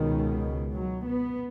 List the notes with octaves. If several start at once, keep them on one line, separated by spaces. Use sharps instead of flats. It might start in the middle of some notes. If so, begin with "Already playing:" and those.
Already playing: C#2 B2 D#3
F#3
B3